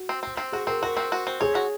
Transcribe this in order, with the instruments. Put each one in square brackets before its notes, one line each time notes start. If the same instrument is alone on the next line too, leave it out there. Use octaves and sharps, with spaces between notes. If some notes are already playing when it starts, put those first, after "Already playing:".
Already playing: [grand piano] F#4
[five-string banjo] C4
C4
C4
[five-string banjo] F#4 [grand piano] G#4
[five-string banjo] C4 [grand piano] A#4
[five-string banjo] F#4 [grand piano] A#4
[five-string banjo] C4
F#4
C4
[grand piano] G#4 [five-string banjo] C#5
[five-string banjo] F#4